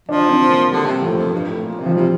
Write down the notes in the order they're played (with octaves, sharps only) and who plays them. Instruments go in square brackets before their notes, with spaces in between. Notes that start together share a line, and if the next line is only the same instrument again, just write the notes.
[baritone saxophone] F3 [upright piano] D4
[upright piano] C4
A#3
[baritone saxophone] D3 [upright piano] G3
[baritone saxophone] C3
[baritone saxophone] A2 [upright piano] F3
[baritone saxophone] F2
G2
A2
A#2
C3
[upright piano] F3
[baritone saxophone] C3 [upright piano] G3